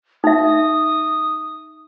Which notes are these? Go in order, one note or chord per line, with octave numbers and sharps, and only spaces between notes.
D#4 E5 D#6